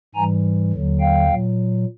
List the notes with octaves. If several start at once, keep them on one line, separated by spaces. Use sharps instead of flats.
G#2 E3 G3 G#5 A#5
D#2 D3 F#3
F5 G5
A#2 F#3